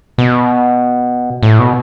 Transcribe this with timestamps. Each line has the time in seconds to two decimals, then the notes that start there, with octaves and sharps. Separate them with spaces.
0.18 B2
1.43 A2
1.59 B2